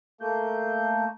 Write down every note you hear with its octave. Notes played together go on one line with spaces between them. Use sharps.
A3 A#3 G6